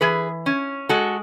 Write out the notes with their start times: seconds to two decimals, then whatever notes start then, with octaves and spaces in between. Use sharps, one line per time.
0.01 E3 G#4 B4
0.46 C#4
0.89 G#3 F#4 A4